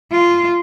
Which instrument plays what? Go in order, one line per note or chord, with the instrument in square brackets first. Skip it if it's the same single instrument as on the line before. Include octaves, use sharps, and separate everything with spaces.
[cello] F4